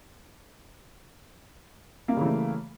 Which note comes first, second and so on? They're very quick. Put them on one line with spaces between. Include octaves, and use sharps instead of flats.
A#3 G3 C#3 E3 A3